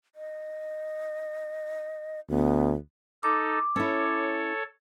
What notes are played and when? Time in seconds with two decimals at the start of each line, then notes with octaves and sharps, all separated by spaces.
0.15 D#5
2.29 D2 B3
3.23 D#4 A4 D6
3.76 C#4 E4 A4 C#5